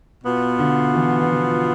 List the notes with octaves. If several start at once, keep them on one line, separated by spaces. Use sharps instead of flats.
B2 B3 F4
D3
E3
E3
F3